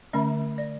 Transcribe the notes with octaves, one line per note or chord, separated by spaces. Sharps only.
D3 A3 C#4 E5
D5